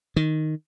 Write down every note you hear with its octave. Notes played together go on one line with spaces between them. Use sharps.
D#3